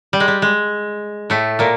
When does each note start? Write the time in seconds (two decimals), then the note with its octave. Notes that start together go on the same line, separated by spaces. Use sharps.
0.13 G3
0.20 G#3
0.28 G3
0.42 G#3
1.30 A2 A3
1.59 A#2 A#3